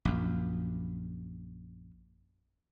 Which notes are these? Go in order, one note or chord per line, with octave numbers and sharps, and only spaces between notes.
A#1 F#2